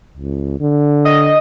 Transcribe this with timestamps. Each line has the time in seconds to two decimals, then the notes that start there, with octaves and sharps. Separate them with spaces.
0.18 C#2
0.60 D3
1.05 D#5